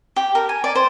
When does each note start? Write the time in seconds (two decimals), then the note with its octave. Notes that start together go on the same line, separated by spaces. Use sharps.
0.16 G4
0.35 A#4
0.49 G#5
0.64 D5
0.75 C5